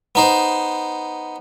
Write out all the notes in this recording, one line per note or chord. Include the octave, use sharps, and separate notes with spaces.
B3 D#4 C5